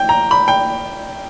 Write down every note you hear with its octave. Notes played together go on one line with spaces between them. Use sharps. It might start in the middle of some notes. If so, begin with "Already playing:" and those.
Already playing: G5
A#5
B5
G5